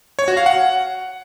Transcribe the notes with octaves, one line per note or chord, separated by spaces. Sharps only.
C#5
F#4
F5
F#5